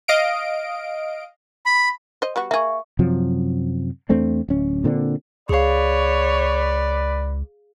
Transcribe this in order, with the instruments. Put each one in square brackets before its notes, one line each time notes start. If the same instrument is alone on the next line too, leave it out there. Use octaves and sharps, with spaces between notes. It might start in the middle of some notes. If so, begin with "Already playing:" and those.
[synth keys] D#5 F5 D7
[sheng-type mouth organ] B5
[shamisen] C5 D#5
G3 B3 F#4
[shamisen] A#3 G#4 [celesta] E5 C#6
[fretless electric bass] F#2 C3 F3 F#3
E2 A3 C4 D4
D1 C#4
A#2 D3 C4 D4
[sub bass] C#2 [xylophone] G#4 F5 [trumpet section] B4 D5 [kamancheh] C#5